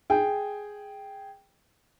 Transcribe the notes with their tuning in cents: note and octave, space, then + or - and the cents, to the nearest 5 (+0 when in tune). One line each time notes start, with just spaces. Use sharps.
G#4 +0 G5 +0